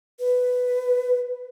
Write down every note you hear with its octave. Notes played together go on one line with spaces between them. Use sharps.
B4